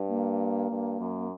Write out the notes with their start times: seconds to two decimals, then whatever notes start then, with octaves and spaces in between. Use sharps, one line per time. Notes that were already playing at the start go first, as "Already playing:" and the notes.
Already playing: G2
0.09 A#3
0.70 G2
1.00 F#2